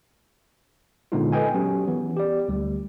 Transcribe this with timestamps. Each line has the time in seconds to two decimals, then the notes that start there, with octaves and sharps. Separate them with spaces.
1.12 A#2 D3 G#3 B3 D#4 F4
1.32 A4 B4 D#5 G5 G#5
1.54 F#3 C#4 G4
1.88 E3 B3
2.17 G4 D5
2.49 D2 G3